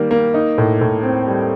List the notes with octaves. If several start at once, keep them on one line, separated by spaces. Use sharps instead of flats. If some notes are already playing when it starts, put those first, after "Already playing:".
Already playing: D#3 G3 A#3
A#3
D#4
A2
A2
C4
G3